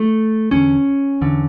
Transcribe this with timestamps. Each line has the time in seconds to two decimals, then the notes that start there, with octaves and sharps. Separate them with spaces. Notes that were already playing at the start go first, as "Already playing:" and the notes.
Already playing: A3
0.51 E2 D3 C#4
1.21 E2 D3